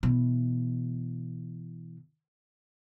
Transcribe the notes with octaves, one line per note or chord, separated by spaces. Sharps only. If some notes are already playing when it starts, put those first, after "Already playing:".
B2 E3